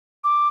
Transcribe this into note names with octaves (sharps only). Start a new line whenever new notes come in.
D6